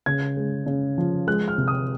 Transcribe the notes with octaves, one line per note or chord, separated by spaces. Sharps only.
C#3 G#6
G#3
C#3
F3
G#3 F#6
F6
C3
D#6